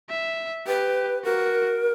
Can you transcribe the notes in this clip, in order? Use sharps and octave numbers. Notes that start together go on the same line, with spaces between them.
E5
G4 B4
F#4 A#4